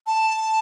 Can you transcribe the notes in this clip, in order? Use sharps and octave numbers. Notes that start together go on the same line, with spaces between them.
A5